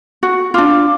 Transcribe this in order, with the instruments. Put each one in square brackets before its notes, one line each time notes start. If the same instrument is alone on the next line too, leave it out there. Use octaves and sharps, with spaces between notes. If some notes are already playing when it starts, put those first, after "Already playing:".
[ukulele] F#4
[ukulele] D4 F4 [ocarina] D6